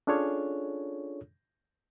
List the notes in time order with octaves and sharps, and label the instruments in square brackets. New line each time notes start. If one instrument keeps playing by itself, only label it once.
[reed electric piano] C#4 D4 F4 G#4 A4 C#5